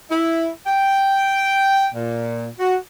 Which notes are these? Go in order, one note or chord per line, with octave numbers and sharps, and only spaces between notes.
E4
G5
A#2
F#4